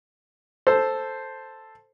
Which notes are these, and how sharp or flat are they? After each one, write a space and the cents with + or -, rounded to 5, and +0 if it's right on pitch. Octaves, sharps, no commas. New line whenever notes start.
A4 +0 C5 +0